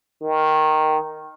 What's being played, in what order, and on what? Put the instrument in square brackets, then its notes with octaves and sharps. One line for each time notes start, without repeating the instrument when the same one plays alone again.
[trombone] D#3